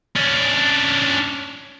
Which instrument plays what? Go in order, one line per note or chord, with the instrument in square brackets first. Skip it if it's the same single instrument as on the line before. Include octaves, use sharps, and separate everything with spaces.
[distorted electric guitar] C#4 D4